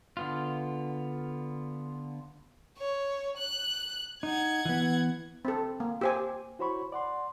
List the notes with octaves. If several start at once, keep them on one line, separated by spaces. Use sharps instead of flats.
D3 B3 F4
C#5
F#6
D#4 F#5 G#6
E3 B3
C4 A4
A#3
G4 C5 G#5
E4 F#4 C5 C#5 B5 C#6
D5 F#5 C6